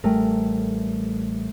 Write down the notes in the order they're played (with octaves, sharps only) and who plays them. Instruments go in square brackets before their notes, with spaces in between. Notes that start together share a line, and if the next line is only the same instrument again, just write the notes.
[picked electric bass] A1 G3 [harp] A3 A#4